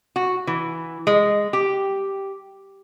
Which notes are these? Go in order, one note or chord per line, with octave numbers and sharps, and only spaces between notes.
F#4
E3
G#3
G4